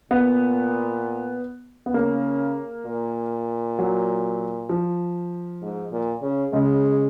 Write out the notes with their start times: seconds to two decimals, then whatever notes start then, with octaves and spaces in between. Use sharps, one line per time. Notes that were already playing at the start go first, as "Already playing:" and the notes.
0.11 A#2 B3
1.86 B3
1.94 C#3 A#3
2.86 A#2
3.79 F#3
4.69 F3
5.62 G#2
5.93 A#2
6.22 C#3
6.53 C#3 G#3